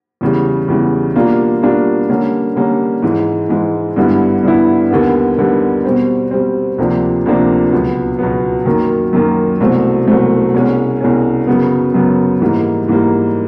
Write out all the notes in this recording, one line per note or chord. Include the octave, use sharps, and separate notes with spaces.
E2 C#3 E3 G3
E2 C#3 E3 G3
B2 G3 A#3 D4 F4
B2 G3 A#3 D4 F4
D3 G3 A#3 C#4
D3 G3 A#3 C#4
G#2 E3 G#3
G#2 E3 G#3
G2 D3 G3 B3 E4
G2 D3 G3 B3 E4
D#2 D3 G3 B3
D#2 D3 G3 B3
B2 G3 C4
B2 G3 C4
D2 C3 F3 A#3 D4
D2 C3 F3 A#3 D4
C#2 B2 F#3 B3
C#2 B2 F#3 B3
F#2 D#3 F#3 A#3
F#2 D#3 F#3 A#3
C2 B2 F#3 A3 C4
C2 B2 F#3 A3 C4
C2 B2 G#3 C#4
C2 B2 G#3 C#4
F#2 C#3 F#3 B3
F#2 C#3 F#3 B3
G#2 E3 G3 A#3
G#2 E3 G3 A#3